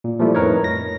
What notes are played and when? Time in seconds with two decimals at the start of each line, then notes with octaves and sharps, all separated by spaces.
0.04 A#2
0.19 A#2 F3 G3 A3 E4
0.35 F2 A2 D#4 A#4 B4 C#5
0.64 A#6